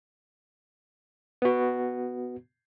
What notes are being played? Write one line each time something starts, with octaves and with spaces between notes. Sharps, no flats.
B3 F#4